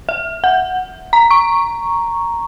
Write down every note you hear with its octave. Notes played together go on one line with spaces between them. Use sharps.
E5
F#5
A#5
C#6